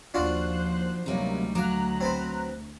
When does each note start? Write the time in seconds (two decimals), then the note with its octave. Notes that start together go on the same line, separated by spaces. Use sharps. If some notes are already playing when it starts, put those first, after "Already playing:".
0.14 D#2 F3 D4 F4 F#4 C5 F#6
1.06 D2 C3 F#3 G3 A#3 D#4
1.55 F#3 F5 A#5 D6 F#6
2.00 C4 B4 C5